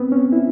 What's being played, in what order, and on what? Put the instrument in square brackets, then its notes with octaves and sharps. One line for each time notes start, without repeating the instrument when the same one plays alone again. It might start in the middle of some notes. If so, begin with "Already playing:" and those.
Already playing: [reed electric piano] B3 C4
C#4
E4